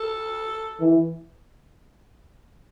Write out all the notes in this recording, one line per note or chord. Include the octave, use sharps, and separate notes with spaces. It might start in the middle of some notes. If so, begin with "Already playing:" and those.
Already playing: A4
E3